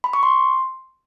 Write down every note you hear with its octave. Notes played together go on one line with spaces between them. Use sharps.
B5
C#6
C6